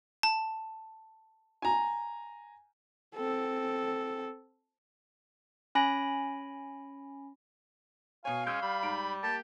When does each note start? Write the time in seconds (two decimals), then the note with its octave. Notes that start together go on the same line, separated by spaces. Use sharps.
0.23 A5
1.62 G#5 A#5
3.15 C4 A4
5.75 C#4 G#5 B5 A#6 D7
8.25 B2 C#5 F5 G#5
8.46 G#3 C#4 E6 G6 D7
8.62 G3 B5
8.82 G#2 A#5 D7
9.23 A#3 G4 A5